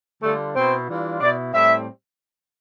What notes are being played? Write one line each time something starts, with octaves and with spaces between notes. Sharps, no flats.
D3 G3 A3 D4 F4 A4
B2 B3 C4 E4 C5
E3 G3 D4 F4
B2 B3 D4 E4 D5
A2 G3 C4 E4 E5